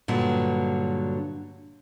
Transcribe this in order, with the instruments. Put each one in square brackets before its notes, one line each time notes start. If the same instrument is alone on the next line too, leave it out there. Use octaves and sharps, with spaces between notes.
[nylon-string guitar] G2 A#2 D3 F#3